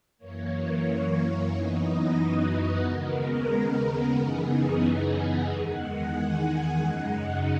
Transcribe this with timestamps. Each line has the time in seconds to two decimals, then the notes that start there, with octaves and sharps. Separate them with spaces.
0.18 F#2 E3 A#3 C#5
1.50 F#2 E3 B3 D#4 D#5
2.16 F#4
2.82 D#2 C#3 G#3 B3 A#4
4.14 F#2 C#3 E3 B3 D#4 G#4
5.46 E2 D#3 G#3 F#5
6.12 G#5
6.77 F#2 C#3 G#3 D#4 F#5